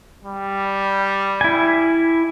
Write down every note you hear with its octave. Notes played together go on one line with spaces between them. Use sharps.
G3
E4 G#5